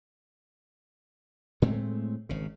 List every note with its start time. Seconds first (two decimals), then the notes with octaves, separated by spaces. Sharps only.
1.62 A2 G#3 A3 C4
2.29 G#1 C#3